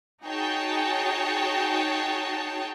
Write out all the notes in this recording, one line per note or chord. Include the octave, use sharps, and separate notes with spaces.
D#4 F#4 G#4 C#5 G5 A5